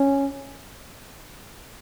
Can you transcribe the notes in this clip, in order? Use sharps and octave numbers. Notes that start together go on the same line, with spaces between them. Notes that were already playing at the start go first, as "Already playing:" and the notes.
Already playing: C#4